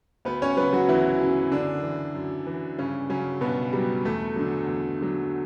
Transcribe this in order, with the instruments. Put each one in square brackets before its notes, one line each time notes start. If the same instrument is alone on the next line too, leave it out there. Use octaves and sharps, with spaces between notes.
[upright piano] D2 B3 B4
C#4 C#5
C#3 F#3 B3 B4
F#3 F#4
D2 E3 E4
C#3 F#3
F#2 D3 D4
E3
F#2
E3
G2 C#3 C#4
C#3 F#3 C#4
G2 B2 B3
F#3 G3
E2 A3
D3 F#3
E2
D3 F#3